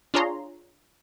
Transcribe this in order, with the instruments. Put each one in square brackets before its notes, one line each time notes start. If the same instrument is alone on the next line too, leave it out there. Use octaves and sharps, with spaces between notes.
[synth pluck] D4 F4 G#4 C#5 A#5 C6